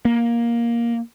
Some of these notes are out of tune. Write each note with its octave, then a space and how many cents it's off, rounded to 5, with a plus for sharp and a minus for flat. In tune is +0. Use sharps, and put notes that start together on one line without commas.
A#3 +10